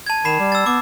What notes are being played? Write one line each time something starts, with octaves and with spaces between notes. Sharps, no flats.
A5 G#6
D#3 B5 C7 E7
G3
E6 A6
B3 D6